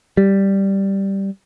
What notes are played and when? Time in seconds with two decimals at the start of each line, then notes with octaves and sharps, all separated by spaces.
0.17 G3